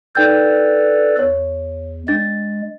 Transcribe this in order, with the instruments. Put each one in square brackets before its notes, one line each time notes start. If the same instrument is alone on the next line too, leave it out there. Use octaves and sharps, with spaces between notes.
[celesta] D#4 G5 G6 [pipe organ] A4 B4 D5
[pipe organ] E2 [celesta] C#5
[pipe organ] G#3 [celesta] D4 A6